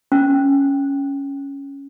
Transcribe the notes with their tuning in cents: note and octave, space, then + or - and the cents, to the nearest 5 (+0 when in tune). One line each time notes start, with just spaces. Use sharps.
C#4 +0